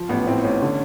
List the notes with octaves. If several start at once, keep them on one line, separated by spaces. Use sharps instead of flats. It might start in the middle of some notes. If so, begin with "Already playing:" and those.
Already playing: F3
A1 B3
A2 C4
A1 C#4
D3